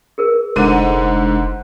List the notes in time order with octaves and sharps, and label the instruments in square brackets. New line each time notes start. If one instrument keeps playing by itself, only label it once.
[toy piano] G#4 A#4 B4
[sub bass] F1 [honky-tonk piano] G#2 D3 D#7 [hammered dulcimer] C5 F#5 [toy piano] D6